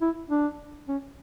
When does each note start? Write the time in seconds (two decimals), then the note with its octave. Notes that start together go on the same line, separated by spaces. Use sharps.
0.02 E4
0.30 D4
0.88 C#4